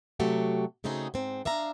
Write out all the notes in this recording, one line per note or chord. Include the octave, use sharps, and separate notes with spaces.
C3 F#3 A3 F#4 G4
C#3 A3 C4 D#4 F#4 G#4
G#2 C4
D4 E5 F5 A#5